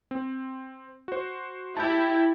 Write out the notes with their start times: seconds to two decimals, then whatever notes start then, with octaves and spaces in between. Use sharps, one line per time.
0.11 C4
1.08 F#4 C5
1.77 E4 G4 E5 A5 G6